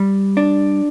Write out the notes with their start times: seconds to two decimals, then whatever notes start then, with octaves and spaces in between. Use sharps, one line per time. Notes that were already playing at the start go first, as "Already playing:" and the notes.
Already playing: G3
0.37 D4